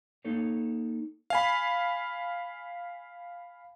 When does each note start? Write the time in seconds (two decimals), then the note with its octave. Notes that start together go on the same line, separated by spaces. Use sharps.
0.25 A#3 D#4 A4 C#5
1.30 F5 G#5 B5